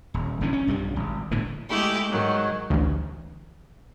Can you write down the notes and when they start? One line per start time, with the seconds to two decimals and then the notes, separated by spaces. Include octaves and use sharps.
0.14 D#1
0.41 F#1 G2 E3 C#4
0.53 C#4
0.67 B1 G2 F3 G3
0.96 G#1
1.31 G1 A2 D3 E3
1.69 G#3 A3 E4 G4
2.09 G#2 D#3 F#3
2.70 A1 D2